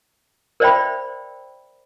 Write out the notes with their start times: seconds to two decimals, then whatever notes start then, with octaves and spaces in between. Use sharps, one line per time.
0.60 A#4 C5 D5 E5 G5 B5